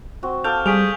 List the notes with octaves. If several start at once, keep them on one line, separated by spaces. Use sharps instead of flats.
C4 F#4
A4 F5 D6 F6 G6 F7
G3 G#4 F5 C#6 B6 D7 F7